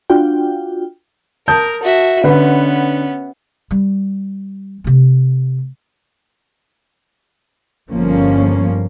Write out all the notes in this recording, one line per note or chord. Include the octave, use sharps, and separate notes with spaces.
D4 F4 F#4 G5
A#4 A5 D#6 G6
F#4 E5
D3 B3 C#4 B4
G3
C3 A3
G1 F3 A#3 C#4